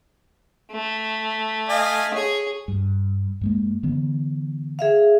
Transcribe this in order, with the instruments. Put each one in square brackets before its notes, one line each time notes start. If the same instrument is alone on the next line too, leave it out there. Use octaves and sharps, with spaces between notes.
[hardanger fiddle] A3
[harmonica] D#5 F5 G#5
[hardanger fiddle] G#4 [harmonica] C#5
[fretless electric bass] G2
F#2 G#3 A#3
D3 E3 B3
[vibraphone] G#4 E5 F5